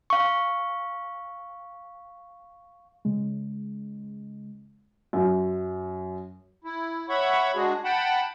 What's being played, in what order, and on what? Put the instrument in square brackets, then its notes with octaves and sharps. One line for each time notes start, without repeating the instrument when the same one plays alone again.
[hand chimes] F5 C#6
[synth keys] C#3 G#3
[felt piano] F#2
[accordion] E4
C#5 E5 F#5 B5 C#6
G#3 D4 F#4 G#4
F#5 G5 A5 B5